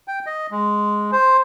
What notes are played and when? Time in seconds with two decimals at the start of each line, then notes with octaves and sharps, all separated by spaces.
0.08 G5
0.26 D#5
0.51 G#3
1.12 C5